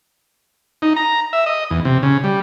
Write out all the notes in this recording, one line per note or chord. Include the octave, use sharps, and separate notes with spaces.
D#4
A#5
E5
D#5
E2
C3
C#3
G3